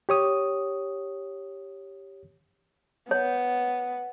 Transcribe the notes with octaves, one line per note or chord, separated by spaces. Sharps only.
G4 C#5 D#6
B3 C#5